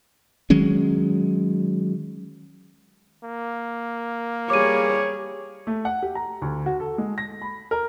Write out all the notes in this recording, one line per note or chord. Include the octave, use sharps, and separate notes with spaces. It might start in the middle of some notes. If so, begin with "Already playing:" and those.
D#3 F#3 G#3 C#4
A#3
G3 G#4 C#5 D6 D#7
A3
F#5
G4
A#5
D2
F#4
A4
G#3
A#6
B5
A#4